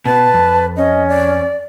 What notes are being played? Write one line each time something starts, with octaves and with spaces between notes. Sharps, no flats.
B2 B4 A5
F2
C#4 D#5
D5